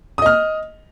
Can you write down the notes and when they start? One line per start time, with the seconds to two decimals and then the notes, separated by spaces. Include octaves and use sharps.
0.18 D#6
0.22 D#5
0.26 F6